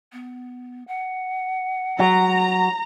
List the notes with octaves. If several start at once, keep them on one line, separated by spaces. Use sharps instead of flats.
B3
F#5
F#3 A#5